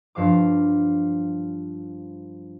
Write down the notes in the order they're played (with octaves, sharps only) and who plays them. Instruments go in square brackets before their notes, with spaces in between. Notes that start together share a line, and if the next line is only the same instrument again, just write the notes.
[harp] G2 F3 F5 D6